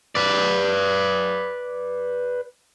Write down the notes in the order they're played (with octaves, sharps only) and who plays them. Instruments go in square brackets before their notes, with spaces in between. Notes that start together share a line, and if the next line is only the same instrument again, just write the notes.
[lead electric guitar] B4 D5